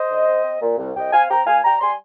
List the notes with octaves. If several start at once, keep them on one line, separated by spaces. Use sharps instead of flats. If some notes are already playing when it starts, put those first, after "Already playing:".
Already playing: C5 D#5
D3
C4
C4
A#2
C2
C2 D#5 G5
C4 F5 G#5
C4 G5 A#5
A#2 F5 G#5
G3 G5 A#5
G3 G#5 C6